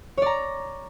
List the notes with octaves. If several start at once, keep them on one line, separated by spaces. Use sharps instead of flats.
C#5 D5 A#5